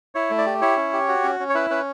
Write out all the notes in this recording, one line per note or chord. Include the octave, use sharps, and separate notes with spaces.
E4 C#5
A3
D5
G4
E4 C#5
C#4
G4
F#4
C#4
C#4
C#5
E4 B4
C#4 B4